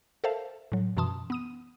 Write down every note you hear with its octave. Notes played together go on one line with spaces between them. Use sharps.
A4 A#4 C5 E5 F5 A5
A2 F#3
F#2 B2 E3 A5 C6 D#6
B3 D#6 D#7